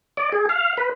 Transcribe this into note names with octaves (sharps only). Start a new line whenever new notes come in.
D5
G#4
F5
B4